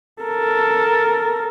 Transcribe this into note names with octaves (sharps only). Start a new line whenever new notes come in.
A4 A#4